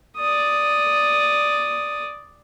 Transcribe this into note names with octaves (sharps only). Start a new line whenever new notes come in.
D5 D#6